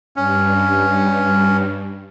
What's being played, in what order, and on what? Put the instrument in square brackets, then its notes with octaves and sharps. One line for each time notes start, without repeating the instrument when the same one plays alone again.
[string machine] G2 [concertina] C#4